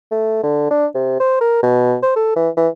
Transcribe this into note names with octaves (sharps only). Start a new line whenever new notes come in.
A3
D3
D4
C3
C5
A#4
B2
C5
A4
E3
E3